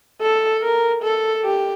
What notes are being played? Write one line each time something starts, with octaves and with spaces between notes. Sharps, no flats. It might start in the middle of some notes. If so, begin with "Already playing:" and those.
A4
A#4
A4
G4